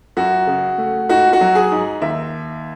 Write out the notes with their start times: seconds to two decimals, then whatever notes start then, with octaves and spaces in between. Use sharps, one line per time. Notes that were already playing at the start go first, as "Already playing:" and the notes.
0.17 F#2 F#4
0.47 C#3
0.78 A3
1.09 G#2 F#4
1.33 F#4
1.41 F#3
1.55 G#4
1.72 G#2
2.02 D#2 E5